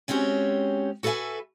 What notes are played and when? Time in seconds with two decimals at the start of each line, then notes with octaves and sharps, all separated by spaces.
0.08 G#3 C4 C#4 F#4 G4 C#5
1.03 F#4 A4 B4 C5 E5 G#5